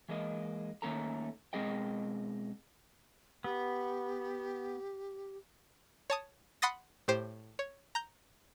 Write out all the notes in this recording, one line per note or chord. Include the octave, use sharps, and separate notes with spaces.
E3 G#3 A#3 D#5
D#3 A3 A#3 C#4 A4 A#5
B2 G#3 C4 G#4 D#5 G5
B3 G4
C#5 A5 D#6
F#5 B5 C6 D#6 A6 A#6
A2 G4 C5
C#5
A#5 G6